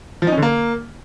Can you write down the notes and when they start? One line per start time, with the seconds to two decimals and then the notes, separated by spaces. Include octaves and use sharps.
0.22 F3
0.27 D#4
0.32 C#4
0.37 D3
0.42 A#3